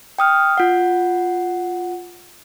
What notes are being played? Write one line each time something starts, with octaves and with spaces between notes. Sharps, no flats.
G5 D#6 F6
F4 F#5